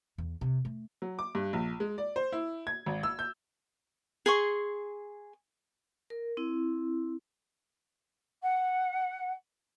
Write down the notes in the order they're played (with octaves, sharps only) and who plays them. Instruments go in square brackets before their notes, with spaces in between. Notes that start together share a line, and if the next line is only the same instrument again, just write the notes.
[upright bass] E2
C3
A3
[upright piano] F#3
D6
G2
A#1
G#3
D5
C5
E4
G#6
G#1
E6
G6
[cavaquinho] G#4 C6 C#6
[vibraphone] A#4
C4 E4
[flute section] F#5